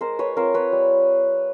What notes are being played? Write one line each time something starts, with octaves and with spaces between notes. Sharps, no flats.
G#3 A#4 C5
B4 C#5
C4 F4 A#4 C5
B4 C#5
G3